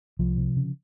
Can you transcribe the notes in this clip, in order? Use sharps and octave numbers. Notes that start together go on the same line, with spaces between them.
C2 F3
C3
C#3